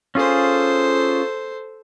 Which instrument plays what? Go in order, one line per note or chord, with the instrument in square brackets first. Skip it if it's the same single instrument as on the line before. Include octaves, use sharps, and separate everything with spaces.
[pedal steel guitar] C#4 F4 G#4 [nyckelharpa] A4 C5